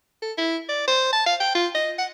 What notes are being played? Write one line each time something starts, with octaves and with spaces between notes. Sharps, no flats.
A4
E4
D5
C5
A5
F5
G5
F4
D#5
F#5